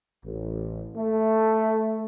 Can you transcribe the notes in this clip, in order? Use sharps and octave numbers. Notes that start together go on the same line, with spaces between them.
A1
A3